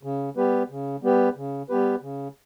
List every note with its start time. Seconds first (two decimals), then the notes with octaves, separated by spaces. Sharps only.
0.03 C#3
0.37 G3 B3 G4 B4
0.70 C#3
1.03 G3 B3 G4 B4
1.36 C#3
1.69 G3 B3 G4 B4
2.02 C#3